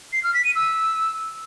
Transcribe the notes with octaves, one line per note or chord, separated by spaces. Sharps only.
C7
F6
B6
D#7
E6